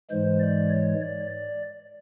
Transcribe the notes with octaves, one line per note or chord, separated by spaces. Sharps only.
G#2 E3 G#3 C5
D5
C#5
D5
D5